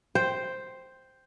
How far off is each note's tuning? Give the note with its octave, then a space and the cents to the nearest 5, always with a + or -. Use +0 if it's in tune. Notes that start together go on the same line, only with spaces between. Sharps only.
C5 +0 G5 +0